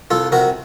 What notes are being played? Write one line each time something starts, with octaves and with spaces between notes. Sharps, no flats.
C2 F4 A4
C3 F#4 A#4